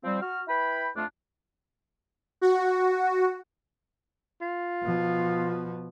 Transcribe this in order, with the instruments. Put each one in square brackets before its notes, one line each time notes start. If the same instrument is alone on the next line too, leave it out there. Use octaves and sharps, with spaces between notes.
[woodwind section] F3 G3 C4
F#4 F6
E4 B4 G5 B5
F2 A3 D4 F4 A5
[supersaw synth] F#4
[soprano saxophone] F4
[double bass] B2 F3